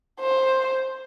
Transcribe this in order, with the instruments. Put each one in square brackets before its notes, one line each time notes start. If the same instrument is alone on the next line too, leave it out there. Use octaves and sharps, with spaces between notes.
[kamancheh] C5